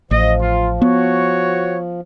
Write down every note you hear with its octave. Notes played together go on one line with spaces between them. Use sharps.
A1 F3 D#5
F4
B3 F#4 C#5